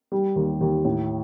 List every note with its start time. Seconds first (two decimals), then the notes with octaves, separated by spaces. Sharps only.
0.12 G3
0.36 D#2
0.61 D#2
0.85 A2